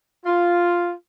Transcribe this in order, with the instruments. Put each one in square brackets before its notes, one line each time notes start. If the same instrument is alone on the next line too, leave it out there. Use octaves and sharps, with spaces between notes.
[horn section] F4